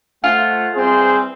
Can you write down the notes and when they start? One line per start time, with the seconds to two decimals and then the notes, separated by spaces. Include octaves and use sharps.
0.24 A3 F4 C5 F#5
0.75 E3 G3 C4 G#4 C5